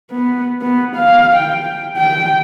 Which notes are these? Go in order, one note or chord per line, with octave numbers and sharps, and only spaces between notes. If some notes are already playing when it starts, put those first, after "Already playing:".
B3
B3
F5
G5
G5